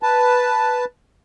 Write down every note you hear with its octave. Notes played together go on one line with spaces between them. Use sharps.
B4 A5